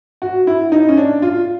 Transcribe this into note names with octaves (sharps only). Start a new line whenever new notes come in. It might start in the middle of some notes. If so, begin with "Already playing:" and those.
F#4
E4
D#4
C#4
D4
F4